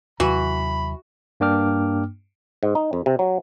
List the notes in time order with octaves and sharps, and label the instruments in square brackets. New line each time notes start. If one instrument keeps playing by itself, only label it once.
[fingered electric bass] D#2 C3 F#3 [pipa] E3 [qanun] F#4 [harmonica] B5
[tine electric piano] G2 A#3 D4 G5 D6 F6
[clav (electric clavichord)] G#2
D#4
F2
C3
F#3